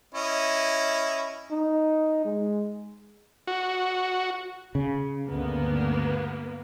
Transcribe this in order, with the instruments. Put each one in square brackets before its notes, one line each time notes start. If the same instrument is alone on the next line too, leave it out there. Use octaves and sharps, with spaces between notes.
[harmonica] C#4 E4 D#5
[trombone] D#4
G#3
[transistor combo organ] F#4
[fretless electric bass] C#3
[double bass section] D2 G2 [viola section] A#3 B3